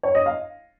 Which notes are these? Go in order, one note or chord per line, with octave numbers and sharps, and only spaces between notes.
C#5
D#5
F5